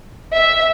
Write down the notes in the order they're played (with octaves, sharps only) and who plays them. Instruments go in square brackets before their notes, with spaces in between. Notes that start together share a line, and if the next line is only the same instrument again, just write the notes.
[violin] E5